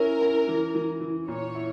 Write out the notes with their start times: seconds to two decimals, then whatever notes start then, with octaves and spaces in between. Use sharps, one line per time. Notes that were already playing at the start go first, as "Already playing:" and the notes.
Already playing: C#4 E4 A#4
0.21 E4
0.48 E3
0.75 E3
1.01 E3
1.28 A#2 C#5
1.55 E4